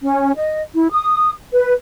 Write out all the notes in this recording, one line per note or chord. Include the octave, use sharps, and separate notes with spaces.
C#4
D#5
E4
D#6
B4